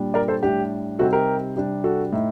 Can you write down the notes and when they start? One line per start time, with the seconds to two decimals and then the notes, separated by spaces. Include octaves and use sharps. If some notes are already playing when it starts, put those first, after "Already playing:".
Already playing: A#2 G3 D4
0.14 A#4 D5
0.28 A4 C5
0.43 A2 G3 D4 G4
0.99 C3 G3 C4 D#4 F#4 A4
1.13 G4 A#4
1.55 C3 G3 D4
1.84 F#4 A4
2.12 A2 A3 D#4